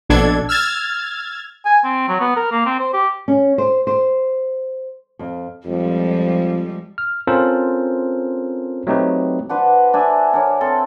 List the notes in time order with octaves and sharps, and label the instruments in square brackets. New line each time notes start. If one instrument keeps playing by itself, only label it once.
[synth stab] A#1 B2 D4 A4 G#6
E6 F6 G#6 A6
[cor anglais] G#5
C4
F#3
B3
A#4
A#3
C4
C5
G4
[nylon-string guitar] C#4
C5
C5
F2
[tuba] F2 [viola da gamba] F3 G3 G#3
[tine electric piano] F6
C4 C#4 F4 A4 A#4 C5
F#3 A3 C4 D#4 G4 B4
[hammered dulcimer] D4 F#4 B4 C5
D4 E5 G#5
D4 A#4 C#5
C4 A4